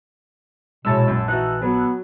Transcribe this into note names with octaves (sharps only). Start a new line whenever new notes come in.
A#1 B2 G#3 E4 C#5 A5 E6
F#2
E3 D#4 E4 F#4 F#6
F#3 B3